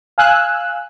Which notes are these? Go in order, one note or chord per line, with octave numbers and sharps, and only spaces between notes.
F5 G#5 E6 F#6